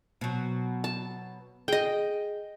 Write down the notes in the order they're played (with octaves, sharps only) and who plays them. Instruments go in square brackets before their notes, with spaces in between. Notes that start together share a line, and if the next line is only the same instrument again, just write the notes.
[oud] B2 F#3
[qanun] A5
[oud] G#4 [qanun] D#5 G5